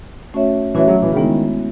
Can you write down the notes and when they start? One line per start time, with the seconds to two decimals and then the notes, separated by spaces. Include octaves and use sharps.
0.34 A3 C#4 F#4 C#5 E5
0.75 E3 A3 C#4 F#4 C#5 E5
0.88 F#3
1.02 E3
1.12 C#3
1.16 D#3 G#3 B3 E4